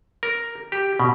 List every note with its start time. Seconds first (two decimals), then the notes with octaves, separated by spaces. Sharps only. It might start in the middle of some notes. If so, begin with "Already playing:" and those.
0.23 A#4
0.72 G4
1.00 B2